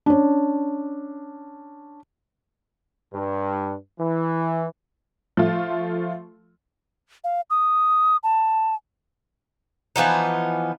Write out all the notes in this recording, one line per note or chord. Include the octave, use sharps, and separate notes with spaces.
C#4 D4
G2
E3
F3 A3 F4
F5
D#6
A5
E3 F3 B3 D#4